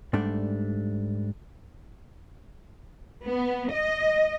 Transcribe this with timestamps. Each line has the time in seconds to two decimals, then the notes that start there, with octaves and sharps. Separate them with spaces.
0.13 G#2 G3 A3 D4
3.25 B3
3.73 D#5